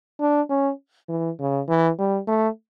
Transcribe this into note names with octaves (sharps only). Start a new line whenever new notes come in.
D4
C#4
E3
C#3
E3
G3
A3